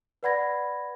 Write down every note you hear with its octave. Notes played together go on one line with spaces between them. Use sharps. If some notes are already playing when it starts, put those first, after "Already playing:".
B4 D5 F#5 B5 G#6 A#6